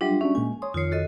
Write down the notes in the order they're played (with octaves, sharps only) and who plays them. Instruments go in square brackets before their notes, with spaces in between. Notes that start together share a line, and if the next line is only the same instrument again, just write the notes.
[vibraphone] F#3 G3 D4 [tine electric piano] F4 G4 E5
[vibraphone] C#4 [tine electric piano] D4 F#4 E5
[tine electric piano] A#2 G#3 A#3 [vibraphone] G#5
[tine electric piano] C#5 C6 [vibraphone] D#6
[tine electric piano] F2 D#3 C7 [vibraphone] F4 C#5
[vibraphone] F#4 A4 D#5